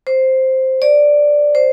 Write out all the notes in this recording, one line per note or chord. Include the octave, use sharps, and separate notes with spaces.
C5
D5
C5